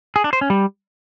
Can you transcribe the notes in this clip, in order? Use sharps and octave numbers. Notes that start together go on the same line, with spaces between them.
G#4
D4
C5
C#4
G3